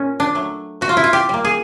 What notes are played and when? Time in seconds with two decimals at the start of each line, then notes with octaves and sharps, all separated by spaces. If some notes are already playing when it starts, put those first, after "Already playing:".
Already playing: A#2 C#4
0.20 D4
0.35 F#3 A3
0.81 B2 F#4
0.89 F4
0.97 E4
1.04 F4
1.13 G4
1.29 G3 A#3
1.45 G#4